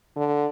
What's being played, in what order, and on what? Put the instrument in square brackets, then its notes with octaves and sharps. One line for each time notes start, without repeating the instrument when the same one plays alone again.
[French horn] D3